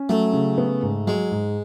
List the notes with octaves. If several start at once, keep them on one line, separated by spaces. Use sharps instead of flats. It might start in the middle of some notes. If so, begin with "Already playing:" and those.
Already playing: C#4
F#3 A3
C#3
B3
G#2
F#3 G#3
G#2